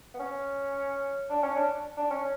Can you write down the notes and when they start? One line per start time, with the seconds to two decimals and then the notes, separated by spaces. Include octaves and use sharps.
0.14 B3
0.19 C#4
1.29 D4
1.43 C#4
1.56 D4
1.97 D4
2.11 C#4